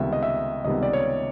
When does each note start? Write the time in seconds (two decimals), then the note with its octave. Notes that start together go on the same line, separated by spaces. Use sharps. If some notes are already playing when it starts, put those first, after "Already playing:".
Already playing: C#2 C3 D#3 G3 B3 E5
0.13 D#5
0.23 E5
0.65 C#2 C3 D#3 G3 B3 D#5
0.83 D5
0.93 C#5